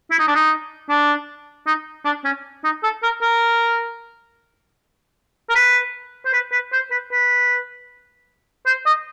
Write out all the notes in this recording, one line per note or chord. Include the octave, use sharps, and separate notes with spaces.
E4
D#4
D4
D#4
D4
D#4
D4
C#4
D#4
A4
A#4
A#4
A#4
B4
C5
B4
B4
C5
B4
B4
C5
D#5